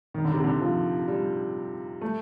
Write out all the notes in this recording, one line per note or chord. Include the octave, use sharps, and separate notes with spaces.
D#3
D3
C3
D3
F3
G3
A3